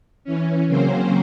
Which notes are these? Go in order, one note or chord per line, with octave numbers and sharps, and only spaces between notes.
E3 C#4
C#3 F#3 A#3 C4 C#4 C5